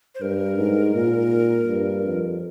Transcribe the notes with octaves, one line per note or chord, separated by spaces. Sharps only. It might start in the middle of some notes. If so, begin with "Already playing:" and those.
C5
G2 A#4
G#2
A#2
G2
F2